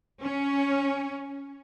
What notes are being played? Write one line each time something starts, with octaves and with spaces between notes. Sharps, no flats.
C#4